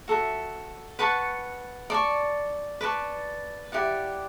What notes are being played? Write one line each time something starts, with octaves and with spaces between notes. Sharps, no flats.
F#4 A4 E5
B4 F#5 A5 C#6
D5 A5 C#6
B4 D5 A5 C#6
E4 G4 D5 F#5